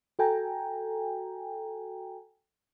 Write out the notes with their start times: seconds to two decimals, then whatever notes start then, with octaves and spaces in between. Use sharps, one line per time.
0.19 F#4 A4 G5 G#5 A#5